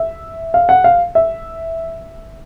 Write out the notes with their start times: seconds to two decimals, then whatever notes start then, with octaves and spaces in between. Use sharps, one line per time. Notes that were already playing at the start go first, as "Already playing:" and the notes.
Already playing: E5
0.54 F5
0.69 F#5
0.84 F5
1.15 E5